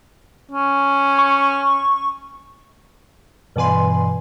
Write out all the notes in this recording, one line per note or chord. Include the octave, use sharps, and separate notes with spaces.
C#4
C#6
G2 B2 E3 B4 G#5 C6